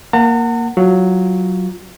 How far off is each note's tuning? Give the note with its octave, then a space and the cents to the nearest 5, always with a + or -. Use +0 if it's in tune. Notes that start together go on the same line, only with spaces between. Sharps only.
A#3 +0 F#5 +0 A#5 -45
F#3 +0 F4 +0